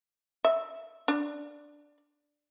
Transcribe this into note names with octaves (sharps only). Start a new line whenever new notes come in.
E5
D4